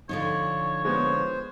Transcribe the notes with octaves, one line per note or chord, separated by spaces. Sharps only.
D3 F3 D#4 C#5
G#3 B3 C5 C#5